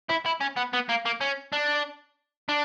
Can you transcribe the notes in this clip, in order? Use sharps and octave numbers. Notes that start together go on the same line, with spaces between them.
E4
E4
C#4
B3
B3
A#3
A#3
C#4
D4
D4